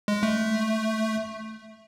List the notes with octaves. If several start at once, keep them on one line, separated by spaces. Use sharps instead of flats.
G#3
A3